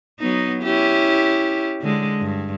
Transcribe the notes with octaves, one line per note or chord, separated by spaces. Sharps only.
F#3 B3 D#4
C#4 E4 G4
D3 G#3
G2